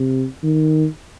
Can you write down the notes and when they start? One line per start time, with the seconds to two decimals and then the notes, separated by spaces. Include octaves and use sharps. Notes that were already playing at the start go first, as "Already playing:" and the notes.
Already playing: C3
0.43 D#3